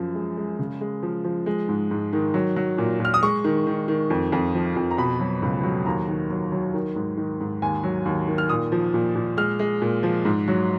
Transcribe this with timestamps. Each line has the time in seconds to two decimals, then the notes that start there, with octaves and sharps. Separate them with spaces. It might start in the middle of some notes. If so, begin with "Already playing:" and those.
Already playing: F#2 F3
0.15 G#3
0.37 G#3
0.59 C#3
0.81 G#3
1.03 F3
1.24 F3
1.46 G#3
1.68 G#2
1.91 G#2
2.13 D#3
2.34 F#3
2.56 F#3
2.78 A#2
3.00 A#2 F6
3.14 D#6
3.22 G#3 C#6
3.44 D#3
3.67 D#3
3.88 D#3
4.10 F2
4.32 F2
4.55 F3
4.76 F2
4.91 A#5
4.98 B2 B5
5.20 F#3
5.42 C#2
5.63 F#3
5.86 D#2 A#5
6.08 D#3
6.30 F#3
6.52 F#3
6.74 D#3
6.96 G#2
7.17 D#3
7.40 G#2
7.62 D#2 G#5
7.84 F#3
8.05 D#2
8.27 D#3
8.38 F6
8.49 A#2 D#6
8.72 F3
8.94 A#2
9.15 A#2
9.37 G#3 F6
9.59 G#3
9.82 A#2
10.03 F3
10.25 G#2
10.48 F#3